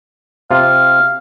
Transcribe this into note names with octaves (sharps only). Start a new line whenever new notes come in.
C3 F4 F5